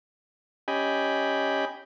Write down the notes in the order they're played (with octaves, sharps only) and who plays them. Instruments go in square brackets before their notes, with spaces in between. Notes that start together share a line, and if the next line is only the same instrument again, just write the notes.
[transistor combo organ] C#4 G4 D#5 G5 G#5 B5